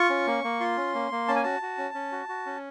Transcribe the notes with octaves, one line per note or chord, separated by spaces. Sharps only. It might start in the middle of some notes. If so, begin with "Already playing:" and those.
Already playing: F4 C#6
C#4
A#3
A#3
F4 C6
C#4
A#3
A#3
C#4 A5
G#5
F#4 A5
F#4
C#4
C#4
F#4
F#4
C#4